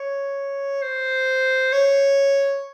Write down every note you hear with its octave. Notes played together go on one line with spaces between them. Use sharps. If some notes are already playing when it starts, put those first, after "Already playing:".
Already playing: C#5
C5
C#5